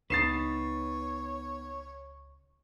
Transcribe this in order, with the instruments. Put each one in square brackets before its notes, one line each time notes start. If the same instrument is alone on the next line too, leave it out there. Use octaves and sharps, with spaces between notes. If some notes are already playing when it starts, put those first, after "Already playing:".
[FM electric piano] C#2 [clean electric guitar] B3 D#4 B4 [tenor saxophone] C#5 [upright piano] A6 C7 E7